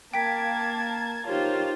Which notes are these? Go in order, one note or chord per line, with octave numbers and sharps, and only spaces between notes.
A#3 G5 A5 G#6 B6
D#4 F4 G4 A#4 C5 C#5 F5